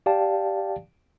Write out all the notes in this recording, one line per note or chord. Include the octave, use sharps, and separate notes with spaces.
G4 D5 F5 G5 A5